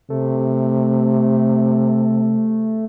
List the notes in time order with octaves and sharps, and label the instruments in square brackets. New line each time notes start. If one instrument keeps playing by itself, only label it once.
[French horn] C3 [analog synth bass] A3